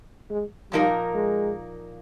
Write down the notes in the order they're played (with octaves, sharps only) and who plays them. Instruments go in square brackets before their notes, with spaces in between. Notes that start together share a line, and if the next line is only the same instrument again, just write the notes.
[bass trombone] G#3
[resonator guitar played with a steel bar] A#2 F3 A#3 D#4 A#4 [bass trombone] G3
[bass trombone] G#3